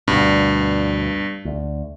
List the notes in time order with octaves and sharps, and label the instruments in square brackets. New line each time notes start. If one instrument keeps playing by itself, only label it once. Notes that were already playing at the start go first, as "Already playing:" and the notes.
[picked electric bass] D2 B2 [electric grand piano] G2
[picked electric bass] D2